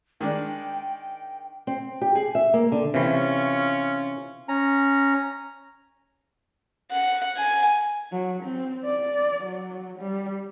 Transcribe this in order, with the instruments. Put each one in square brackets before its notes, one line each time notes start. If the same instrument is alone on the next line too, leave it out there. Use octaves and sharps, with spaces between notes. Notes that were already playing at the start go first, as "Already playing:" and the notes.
[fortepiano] D#3 G#3 D4 [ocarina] G5
[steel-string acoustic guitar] C4
G4
G#4
E5
A#3
D3
[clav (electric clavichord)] C3 E3 [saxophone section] C#4 F4 C#5
[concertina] C#4 A#5
[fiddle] F#5
G#5
[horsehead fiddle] F#3
C4
D5
F#3
G3